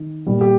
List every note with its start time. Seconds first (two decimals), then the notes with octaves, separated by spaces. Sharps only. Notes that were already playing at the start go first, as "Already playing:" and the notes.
Already playing: D#3
0.26 A#2 G3
0.41 G4